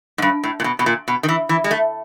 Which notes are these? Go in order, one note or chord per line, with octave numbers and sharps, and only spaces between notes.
G#2
G2
A2
A#2
B2
B2
A#2
B2
D#3
E3
E3
G#3
A3